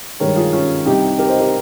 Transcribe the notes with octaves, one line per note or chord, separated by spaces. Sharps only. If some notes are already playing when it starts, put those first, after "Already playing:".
G2 D#3 G#3 A#4 C#5
F4 G#4
C#4 F4
C2 C3 G3 D#4 G4
G4 A#4
C5 D#5
G4 A#4